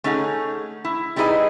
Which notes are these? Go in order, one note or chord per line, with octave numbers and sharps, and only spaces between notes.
A3 C#4 D#4 G#4 F#5
E4
G3 D#4 E4 G#4 B4 D#5